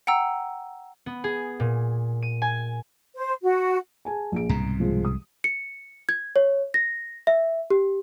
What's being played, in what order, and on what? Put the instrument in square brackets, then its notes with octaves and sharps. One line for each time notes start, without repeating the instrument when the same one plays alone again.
[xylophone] F#5 G5 A#5 E6
[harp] B3
G#4
A#2
D#7
G#5
[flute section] C5
F#4
[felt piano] G#4 G#5 A5
A#1 G#4 D7
[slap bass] C2 G#2 B2 [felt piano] A#5
[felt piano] F3 G#3
D#6
[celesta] C#7
G#6
C#5
A#6
E5
G4